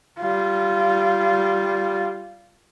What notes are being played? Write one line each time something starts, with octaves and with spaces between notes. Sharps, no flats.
G3 F4